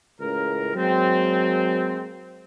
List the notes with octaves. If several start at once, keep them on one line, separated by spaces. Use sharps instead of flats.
C#2 A2 C#3 A#4
F#3 G#3 A#3 C4